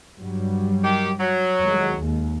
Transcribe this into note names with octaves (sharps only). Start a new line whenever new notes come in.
G2 F#3 G3
D#3 G4
F#3
F2 D#3 G#3
D#2